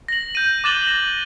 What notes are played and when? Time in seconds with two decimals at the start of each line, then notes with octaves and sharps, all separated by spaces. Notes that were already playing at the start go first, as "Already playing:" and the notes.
0.08 A#6 F#7
0.35 G6 D#7
0.64 D6 F#6 A6 E7 F#7 G7
0.87 A#6